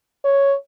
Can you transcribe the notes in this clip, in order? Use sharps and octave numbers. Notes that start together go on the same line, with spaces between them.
C#5